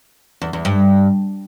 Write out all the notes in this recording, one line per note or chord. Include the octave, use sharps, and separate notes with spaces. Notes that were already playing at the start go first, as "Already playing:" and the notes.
E2
E2
G2